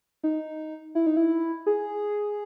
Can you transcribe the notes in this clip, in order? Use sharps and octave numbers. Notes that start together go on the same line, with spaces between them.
D#4
E4
D#4
E4
G#4